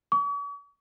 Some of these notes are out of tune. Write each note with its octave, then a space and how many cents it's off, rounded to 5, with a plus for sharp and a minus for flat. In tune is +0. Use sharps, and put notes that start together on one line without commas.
C#6 +45